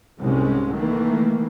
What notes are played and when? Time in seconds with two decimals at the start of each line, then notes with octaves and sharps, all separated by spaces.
0.20 C2 G#2 C3 G#3 C#4
0.73 D#3 E3 A3 A#3